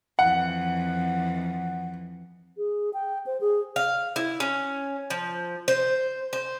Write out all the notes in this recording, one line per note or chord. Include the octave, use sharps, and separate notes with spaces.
F2 E3 F#5
G#4
G5
C5
G#4
F5
E4
C#4
F3
C5
C5